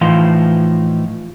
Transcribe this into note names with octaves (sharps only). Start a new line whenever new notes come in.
A2 E3 F3 D#4 F5 C6